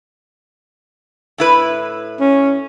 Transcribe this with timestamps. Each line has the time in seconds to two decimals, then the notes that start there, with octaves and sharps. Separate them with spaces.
1.38 A2 E4 B4
2.20 C#4